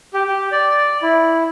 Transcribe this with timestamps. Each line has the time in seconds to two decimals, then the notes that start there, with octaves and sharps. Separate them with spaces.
0.14 G4
0.27 G4
0.52 D5
1.02 E4